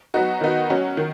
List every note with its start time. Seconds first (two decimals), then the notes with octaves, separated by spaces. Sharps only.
0.14 F#3 B3 D#4 F#4
0.41 D#3 B3 D#4 F#4
0.70 F#3 C#4 F#4
0.97 D#3